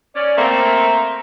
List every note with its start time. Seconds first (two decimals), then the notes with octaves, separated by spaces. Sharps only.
0.16 C#4 D5
0.38 A3 A#3 C4 A#5